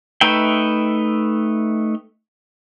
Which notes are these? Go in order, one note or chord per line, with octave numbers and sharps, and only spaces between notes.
A3 D#4 B4 E5 G5